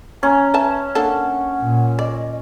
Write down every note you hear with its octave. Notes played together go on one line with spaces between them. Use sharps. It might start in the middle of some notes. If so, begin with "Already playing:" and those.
C#4 A#5
B4 E5 A5
A#3 D4 A4 F#5
A#2
D5 D#5